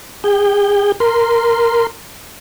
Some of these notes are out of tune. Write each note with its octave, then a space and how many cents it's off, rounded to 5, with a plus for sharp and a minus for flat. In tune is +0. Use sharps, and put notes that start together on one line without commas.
G#4 -35 G5 +0
A#4 +0 C6 -15